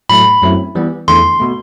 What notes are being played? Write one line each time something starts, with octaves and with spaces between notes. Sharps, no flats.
A2 F#3 A3 B5
F#2 F#3 A3 C4 E4
E3 G3 B3
E2 D3 A3 E4 C6
B2 A3